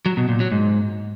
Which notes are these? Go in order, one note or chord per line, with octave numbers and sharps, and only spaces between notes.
F#3
B2
A#2
F#3
G#2